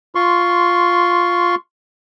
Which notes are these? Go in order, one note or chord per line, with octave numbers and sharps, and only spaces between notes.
F4 C6 C#6